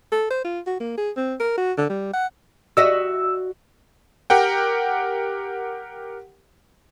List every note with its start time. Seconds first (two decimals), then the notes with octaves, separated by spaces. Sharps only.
0.12 A4
0.30 C5
0.44 F4
0.67 F#4
0.80 A#3
0.98 G#4
1.17 C4
1.40 A#4
1.58 F#4
1.78 D3
1.90 G3
2.14 F#5
2.77 F#4 D#5 E5 E6
4.30 G4 A#4 F#5 G5